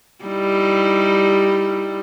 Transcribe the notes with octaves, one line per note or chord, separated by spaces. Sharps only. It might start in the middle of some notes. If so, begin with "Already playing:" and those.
G3 D#4 E4